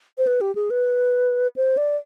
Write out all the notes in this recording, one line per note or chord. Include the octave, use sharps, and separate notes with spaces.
C5
B4
G4
G#4
B4
C5
D5